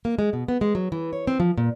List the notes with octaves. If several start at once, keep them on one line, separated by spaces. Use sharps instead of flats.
A#3
G#3
B2
B3
G#3
F#3
E3
C#5
C4
F3
A#2